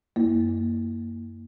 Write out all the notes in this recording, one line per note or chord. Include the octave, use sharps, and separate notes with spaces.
F#2 A#3